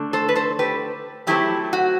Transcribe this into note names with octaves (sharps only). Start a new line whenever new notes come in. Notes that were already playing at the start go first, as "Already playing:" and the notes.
Already playing: D3 A3 D4
A4 C5
B4
A4 C5
G4 B4
D3 F#3 A3 C4 E4 G4
F#4